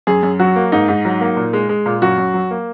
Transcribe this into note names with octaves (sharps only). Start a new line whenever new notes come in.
F#2 G#4
F#2
F#3 F#4
A#3
G#2 D#4
G#2
F#3
A#3
A#2
G#3
G#3
A#2
F#2 F#4
F#2
F#3
A#3